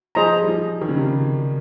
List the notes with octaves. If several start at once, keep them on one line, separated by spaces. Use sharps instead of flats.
F3 G#4 C5 D#5 A#5
G3
F3
D#3
C#3
C3
C#3